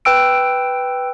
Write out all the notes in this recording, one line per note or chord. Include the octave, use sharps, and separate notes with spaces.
B4 G5 E6 D7